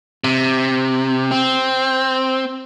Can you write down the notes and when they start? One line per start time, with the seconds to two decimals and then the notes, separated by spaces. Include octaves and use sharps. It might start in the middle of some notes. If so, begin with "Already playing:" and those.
0.24 C3
1.31 C4